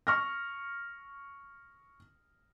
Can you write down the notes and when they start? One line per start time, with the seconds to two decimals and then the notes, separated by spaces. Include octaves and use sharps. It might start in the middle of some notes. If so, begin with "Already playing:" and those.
0.07 C#6 F6 A#6